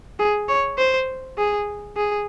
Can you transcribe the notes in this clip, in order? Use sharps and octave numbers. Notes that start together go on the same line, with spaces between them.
G#4
C#5
C5
G#4
G#4